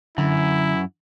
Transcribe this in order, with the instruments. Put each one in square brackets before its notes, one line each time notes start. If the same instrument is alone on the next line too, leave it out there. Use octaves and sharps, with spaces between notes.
[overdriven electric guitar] F#2 [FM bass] D3 [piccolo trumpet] E4